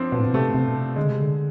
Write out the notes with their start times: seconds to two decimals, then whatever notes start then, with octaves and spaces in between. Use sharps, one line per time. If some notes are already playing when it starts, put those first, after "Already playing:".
Already playing: F3 C4 D4
0.12 B2 B3
0.19 A2
0.27 B2
0.34 C3 A3
0.54 C3
0.68 B2
0.75 C3
0.96 D3 G#3
1.09 C3
1.20 D3